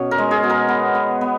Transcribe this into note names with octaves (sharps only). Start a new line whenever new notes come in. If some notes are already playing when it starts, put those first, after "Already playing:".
Already playing: B2 C#4 C#5
A#4
G#3
G#4
B2
A#4
B3
B3
B3